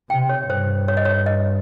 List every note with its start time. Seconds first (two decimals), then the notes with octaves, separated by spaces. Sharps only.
0.10 C3 G5
0.29 C#5
0.50 G2 C5
0.88 C#5
0.97 D#5
1.05 C#5
1.26 D#5